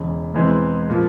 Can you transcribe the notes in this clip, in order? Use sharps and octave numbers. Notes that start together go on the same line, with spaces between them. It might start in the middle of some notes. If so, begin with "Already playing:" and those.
Already playing: E1 E2 C#3
E1 E2 E3 G#3 C4
A#2 F3